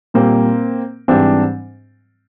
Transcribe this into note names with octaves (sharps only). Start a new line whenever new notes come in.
A#2 G3 A#3 C4
G#2 E3 G3 C4 D4